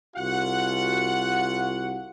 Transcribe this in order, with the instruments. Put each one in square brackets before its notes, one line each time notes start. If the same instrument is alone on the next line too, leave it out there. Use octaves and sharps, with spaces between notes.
[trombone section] C2 F4 F#4 [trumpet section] F#5